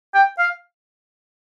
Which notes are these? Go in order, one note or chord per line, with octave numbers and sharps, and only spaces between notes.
G5
F5